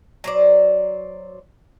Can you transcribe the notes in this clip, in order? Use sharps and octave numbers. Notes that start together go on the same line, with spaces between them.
F#3 C5 D5